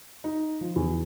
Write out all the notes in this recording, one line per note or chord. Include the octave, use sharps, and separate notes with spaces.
D#4
F3
E2